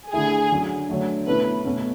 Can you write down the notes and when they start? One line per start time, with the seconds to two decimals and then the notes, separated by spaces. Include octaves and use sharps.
0.12 D3 A3 E4 G#4
0.51 D3 F#3 C#4
0.89 D3 F#3 A3
1.27 B2 A3 C#4 E4 B4
1.64 B2 A3 C#4